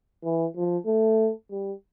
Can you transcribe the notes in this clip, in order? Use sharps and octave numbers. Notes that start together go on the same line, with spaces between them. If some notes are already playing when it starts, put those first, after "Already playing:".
E3
F3
A3
G3